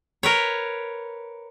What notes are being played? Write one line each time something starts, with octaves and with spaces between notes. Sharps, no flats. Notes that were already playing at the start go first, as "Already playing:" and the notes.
A#4 B4 C#5